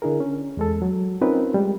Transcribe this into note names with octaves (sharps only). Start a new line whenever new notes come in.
D3 D4 E4 G#4 A#4
C#4
E2 G#3 A4
F#3
C4 C#4 D#4 F4 A#4 B4
G3 G#3